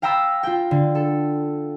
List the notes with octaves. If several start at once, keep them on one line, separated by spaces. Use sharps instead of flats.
F5 G5 A#5 B5 E6 A6
F4 G5
D3
A4